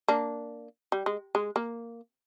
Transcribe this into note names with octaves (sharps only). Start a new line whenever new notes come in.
A#3 D4
G3
G#3
G#3
A#3